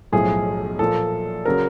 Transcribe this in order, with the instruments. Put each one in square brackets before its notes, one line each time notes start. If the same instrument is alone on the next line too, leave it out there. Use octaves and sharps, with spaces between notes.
[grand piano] B1 A2 F3 [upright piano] G#4
[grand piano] A#2 F3 A#3 [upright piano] A4
[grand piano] C#3 F#3 [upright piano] A#4